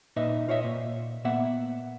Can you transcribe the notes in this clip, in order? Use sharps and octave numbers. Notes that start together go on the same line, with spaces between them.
A#2 D#4 B4 D#5 E5
F4 C#5 D#5 E5
A#2
A#2 A#3 B3 E5 F#5